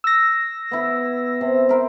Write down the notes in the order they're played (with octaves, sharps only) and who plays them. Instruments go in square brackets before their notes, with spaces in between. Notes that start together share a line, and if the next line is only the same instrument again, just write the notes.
[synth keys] E6 A#6
[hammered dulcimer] B3 E4
C3
E4 A#4 C5